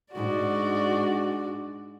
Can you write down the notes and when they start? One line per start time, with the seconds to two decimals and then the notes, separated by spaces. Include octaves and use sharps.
0.13 G#2 D4 F#4 D5